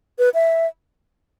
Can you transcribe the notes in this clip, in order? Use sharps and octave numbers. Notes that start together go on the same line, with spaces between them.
B4
E5